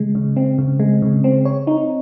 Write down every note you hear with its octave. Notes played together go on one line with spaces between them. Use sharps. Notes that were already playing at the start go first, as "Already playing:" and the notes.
Already playing: C#3 G#3
C#3
C4
C#3
G#3
C#3
C4
C#5
D#4